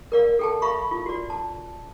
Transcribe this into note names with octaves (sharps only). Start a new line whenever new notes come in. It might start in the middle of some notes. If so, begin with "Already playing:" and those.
A#4 D5 F5
A4 G5 A5
E5 F5 B5 C#6
F4
F#4 D5
A5